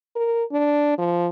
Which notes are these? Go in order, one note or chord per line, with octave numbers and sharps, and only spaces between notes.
A#4
D4
F3